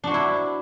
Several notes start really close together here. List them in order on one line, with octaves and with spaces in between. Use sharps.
D4 F#4 C5 E4